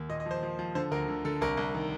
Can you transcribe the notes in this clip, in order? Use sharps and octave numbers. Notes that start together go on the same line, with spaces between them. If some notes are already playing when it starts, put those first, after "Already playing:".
Already playing: D#2
A#2 D#5
D#5
F3 C5
F3
F3
D3 C5
D2 A#4
D3
D3 A4
C2 A#4
C2
D#3